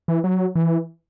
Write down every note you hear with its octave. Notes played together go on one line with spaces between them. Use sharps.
E3
F#3
E3